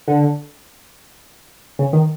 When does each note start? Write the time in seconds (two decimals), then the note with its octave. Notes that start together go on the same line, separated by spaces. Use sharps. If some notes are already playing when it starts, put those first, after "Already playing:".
0.08 D3
1.79 C#3
1.93 D#3